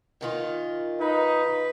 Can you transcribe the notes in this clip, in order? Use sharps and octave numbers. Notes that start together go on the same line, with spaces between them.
A#2 D#3 F4
D#4 B4